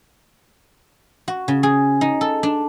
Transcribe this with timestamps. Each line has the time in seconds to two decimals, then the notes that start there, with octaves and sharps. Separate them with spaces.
1.28 F#4
1.48 C#3
1.63 G#4
2.01 D#4
2.21 A4
2.43 D4